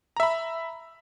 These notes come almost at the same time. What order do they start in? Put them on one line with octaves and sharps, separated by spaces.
A#5 E5 B5